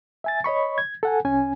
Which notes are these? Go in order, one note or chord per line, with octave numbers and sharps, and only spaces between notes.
E5 G#5 A6
C#5 D#5 B5 C#6
G#6
A4 F#5 G#5
C2 C#4 G#5